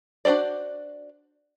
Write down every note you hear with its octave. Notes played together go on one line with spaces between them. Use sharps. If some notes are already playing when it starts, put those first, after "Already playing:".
D4 F#4 A4 C5 D5